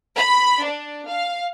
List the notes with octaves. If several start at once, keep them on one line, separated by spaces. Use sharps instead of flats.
B5
D4
F5